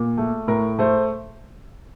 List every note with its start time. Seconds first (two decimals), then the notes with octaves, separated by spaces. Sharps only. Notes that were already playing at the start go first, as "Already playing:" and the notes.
Already playing: A#2
0.17 A3
0.47 A2 A#4
0.79 A3 C5